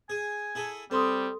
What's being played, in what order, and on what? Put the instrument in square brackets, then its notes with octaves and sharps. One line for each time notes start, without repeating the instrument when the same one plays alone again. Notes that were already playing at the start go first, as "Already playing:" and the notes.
[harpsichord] G#4 [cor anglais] G#5
[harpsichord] E4 G#4 A4
[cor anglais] G3 [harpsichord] C4 [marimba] A4 C6 D#6